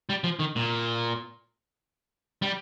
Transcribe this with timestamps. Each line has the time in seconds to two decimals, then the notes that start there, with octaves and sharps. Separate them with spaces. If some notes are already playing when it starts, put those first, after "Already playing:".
0.10 G3
0.24 F3
0.39 D#3
0.56 A#2
2.42 G3